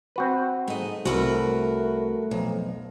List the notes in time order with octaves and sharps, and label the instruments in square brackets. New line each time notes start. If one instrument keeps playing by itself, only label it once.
[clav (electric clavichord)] C4 F#4 B4
[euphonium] G#2 [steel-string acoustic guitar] A3 D#5
[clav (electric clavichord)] C2 [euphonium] A3 [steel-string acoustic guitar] F#4 A#4 B4
[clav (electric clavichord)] B1 [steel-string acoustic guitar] F2